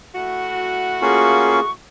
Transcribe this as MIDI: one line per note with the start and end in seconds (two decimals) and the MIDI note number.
0.15 1.70 57
0.15 1.70 64
0.15 1.70 66
1.02 1.60 58
1.02 1.60 61
1.02 1.60 65
1.02 1.63 68
1.02 1.71 85